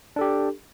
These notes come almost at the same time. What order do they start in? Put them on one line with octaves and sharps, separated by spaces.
D4 A4 G4